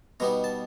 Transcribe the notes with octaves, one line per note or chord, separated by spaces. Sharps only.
B2 G3 B3 D#4 A#5
A5